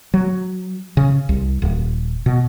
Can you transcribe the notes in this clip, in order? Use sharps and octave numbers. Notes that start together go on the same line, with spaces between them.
F#3
C#3
C2
D#1
B2